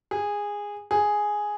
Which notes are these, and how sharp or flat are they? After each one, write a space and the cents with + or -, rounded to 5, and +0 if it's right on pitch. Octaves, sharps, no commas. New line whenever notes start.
G#4 -15
G#4 +0